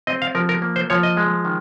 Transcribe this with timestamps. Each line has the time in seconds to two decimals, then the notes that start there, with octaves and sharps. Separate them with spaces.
0.07 C4 D#5
0.22 F5
0.35 F3 A#4
0.49 A#4
0.62 A#3
0.76 C5
0.90 F3 C#5
1.03 D#5
1.17 G#3
1.45 D#3